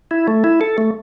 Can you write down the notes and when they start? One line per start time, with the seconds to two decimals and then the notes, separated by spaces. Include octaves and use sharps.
0.11 E4
0.28 A3
0.44 E4
0.61 A4
0.78 A3